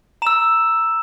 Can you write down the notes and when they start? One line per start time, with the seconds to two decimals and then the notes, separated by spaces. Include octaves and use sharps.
0.22 A#5 E6 E7